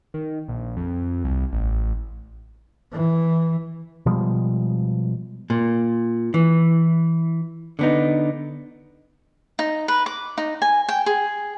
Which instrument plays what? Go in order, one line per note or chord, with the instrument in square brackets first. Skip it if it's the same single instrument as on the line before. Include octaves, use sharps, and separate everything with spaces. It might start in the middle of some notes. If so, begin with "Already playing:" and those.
[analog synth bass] D#3
A#1
F2
C2
A1
[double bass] E3
[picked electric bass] B2 F3 G3 G#3
[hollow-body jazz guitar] A#2
E3
D3 B3 D#4
[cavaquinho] D#4
B4
D6
D#4
G#5
G5
G#4